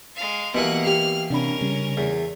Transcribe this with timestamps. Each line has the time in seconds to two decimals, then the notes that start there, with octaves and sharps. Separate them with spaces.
0.16 G#3 F5
0.55 B2 E3 A#3 B3 G4 F#5 F#6
0.85 G4 F6 C7
1.30 C3 C#4 D4 A#4 B5
1.61 C#3 G3
1.97 E2